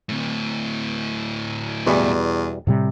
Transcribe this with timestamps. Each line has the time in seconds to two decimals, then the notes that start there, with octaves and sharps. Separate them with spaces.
0.09 D2 A2
1.86 E2 B2 E3 G3
2.67 A2 C3 G3